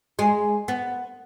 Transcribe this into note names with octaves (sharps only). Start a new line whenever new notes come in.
G#3
B3